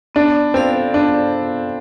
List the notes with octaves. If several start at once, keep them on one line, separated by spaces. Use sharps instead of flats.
B3 D4
C4 F4 A4 D5 F5
B3 D4